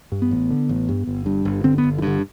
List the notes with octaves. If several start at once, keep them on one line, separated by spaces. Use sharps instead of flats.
G2
B3
A1
D3
A1
G2
G1
G2
G1
D3 C4
B3
G1
E3
G2 D3